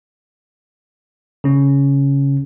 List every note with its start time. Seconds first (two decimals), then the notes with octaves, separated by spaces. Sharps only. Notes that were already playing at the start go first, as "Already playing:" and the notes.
1.44 C#3 C#4